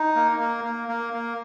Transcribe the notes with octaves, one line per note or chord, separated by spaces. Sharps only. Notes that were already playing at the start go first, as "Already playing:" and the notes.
Already playing: D#4
A#3
A#3
A#3
A#3
A#3